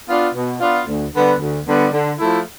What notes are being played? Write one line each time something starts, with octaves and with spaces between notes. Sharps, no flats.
B3 D4 F4
B2
B3 D4 F4
D2
D3 G3 B3
D2
D3 G3 B3
D3
F3 A3 E4